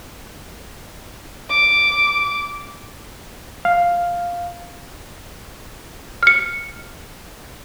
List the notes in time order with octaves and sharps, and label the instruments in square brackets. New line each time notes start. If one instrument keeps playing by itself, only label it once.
[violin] D6
[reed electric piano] F5
[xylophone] F6 C#7